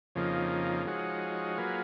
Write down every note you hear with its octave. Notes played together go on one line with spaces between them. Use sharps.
F2 C#3 F3 A#3 D#4
F3 G#3 D#4 F#4 C#5
F#3 A#3 F4 G#4 B4